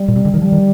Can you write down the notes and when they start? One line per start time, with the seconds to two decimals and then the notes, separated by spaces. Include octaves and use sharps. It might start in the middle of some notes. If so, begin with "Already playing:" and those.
Already playing: G3
0.08 A#2
0.16 C3
0.25 D3
0.34 D#3
0.41 F3 G3
0.52 D#3